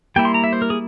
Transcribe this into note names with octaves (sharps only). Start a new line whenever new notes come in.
G3 A#3 E4 G5
C6
A#5
E5
C5
A#4
G#4